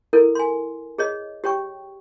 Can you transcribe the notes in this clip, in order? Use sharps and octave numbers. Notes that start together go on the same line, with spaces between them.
E4 A4 A#4
G#5 C6
G#4 C#5 D#5
G4 C#5 G5 C#6